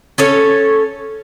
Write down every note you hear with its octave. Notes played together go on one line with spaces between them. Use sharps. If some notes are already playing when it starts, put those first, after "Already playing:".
C#4 A4 C#5